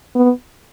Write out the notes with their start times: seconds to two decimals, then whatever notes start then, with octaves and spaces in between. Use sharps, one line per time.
0.15 B3